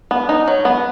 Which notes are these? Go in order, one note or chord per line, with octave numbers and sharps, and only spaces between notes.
B3
D#4
F#3
B3